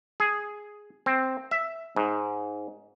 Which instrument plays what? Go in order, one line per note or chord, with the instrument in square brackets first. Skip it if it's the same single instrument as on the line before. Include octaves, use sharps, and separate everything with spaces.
[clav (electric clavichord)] G#4
C4
E5
G#2